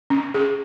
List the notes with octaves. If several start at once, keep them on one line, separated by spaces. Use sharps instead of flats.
C#4
G#4